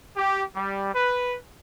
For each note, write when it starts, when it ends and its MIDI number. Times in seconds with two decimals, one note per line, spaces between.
0.16 0.42 67
0.55 0.89 55
0.94 1.36 71